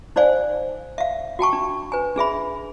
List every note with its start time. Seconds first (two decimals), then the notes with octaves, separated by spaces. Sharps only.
0.16 D#4 C5 D5 F5 G#5
0.98 E5 F5
1.39 F#4 G5 A5 C#6
1.53 D4
1.92 B4 G#5
2.16 D4 G#4 E5 B5